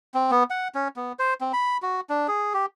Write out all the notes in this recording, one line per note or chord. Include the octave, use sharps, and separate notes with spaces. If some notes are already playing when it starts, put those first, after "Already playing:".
C4
B3
F#5
C#4
B3
C5
C4
B5
F#4
D4
G#4
G4